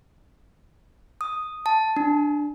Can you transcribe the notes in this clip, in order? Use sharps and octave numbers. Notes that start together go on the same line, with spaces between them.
D#6
A5
D4